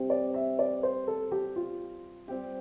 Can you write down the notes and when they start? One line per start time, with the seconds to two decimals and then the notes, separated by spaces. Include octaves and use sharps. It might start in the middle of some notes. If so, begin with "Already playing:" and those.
Already playing: C3 G3 C4
0.10 D5
0.34 E5
0.59 D5
0.83 C5
1.07 A4
1.32 G4
1.56 F4
2.28 G3 C4 G4